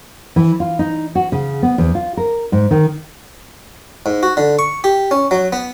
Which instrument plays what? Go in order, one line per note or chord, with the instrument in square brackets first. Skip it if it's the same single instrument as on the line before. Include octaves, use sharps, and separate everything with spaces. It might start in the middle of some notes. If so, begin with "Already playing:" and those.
[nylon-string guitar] E3
F4
D#4
F#4
C#3
B3
E2
F4
A#4
G#2
D#3
[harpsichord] G#2
F#4
D3
C#6
G4
C#4
F#3
B3